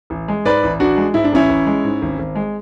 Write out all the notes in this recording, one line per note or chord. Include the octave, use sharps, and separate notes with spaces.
A1
G#3
G#2 B4 D5
A1
A1 D4 F#4
G#3
G#2 E4
D4
A1 C#4 E4
A1
G#3
G#2
G#1
G#1
G#3